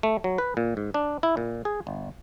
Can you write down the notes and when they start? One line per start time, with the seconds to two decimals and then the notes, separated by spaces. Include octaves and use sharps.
0.03 A3
0.24 F#3
0.38 B4
0.57 A#2
0.77 G#2
0.94 D4
1.23 E4
1.37 A#2
1.65 G#4
1.87 G1